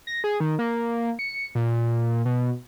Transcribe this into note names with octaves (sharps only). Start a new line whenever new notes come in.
A#6
G#4
D#3
A#3
C#7
A#2
B2